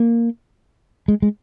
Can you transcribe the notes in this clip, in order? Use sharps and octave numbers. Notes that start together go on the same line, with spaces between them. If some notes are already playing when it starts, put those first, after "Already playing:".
Already playing: A#3
G#3
G#3